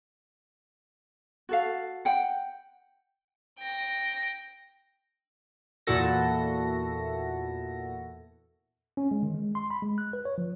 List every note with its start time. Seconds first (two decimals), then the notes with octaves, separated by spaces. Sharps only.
1.49 F#4 A4 F5
2.05 F#5 G5
3.59 G5 A#6
5.87 E2 A#2 E4 F#4 A4 A#6
8.97 C#4
9.11 G#3
9.23 D#3
9.34 G#3
9.55 C6
9.71 B5
9.82 G#3
9.98 F#6
10.13 B4
10.25 C#5
10.38 F3